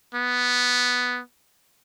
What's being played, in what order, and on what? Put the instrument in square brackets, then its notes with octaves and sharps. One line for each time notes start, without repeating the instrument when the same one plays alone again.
[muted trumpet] B3